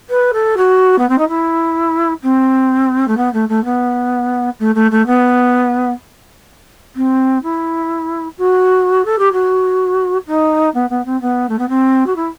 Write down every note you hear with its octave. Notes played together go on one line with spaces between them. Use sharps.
B4
A4
F#4
B3
C4
D#4
E4
C4
A3
B3
A3
A3
B3
A3
A3
A3
B3
C4
E4
F#4
A4
G4
F#4
D#4
B3
B3
C4
B3
A3
B3
C4
F#4
E4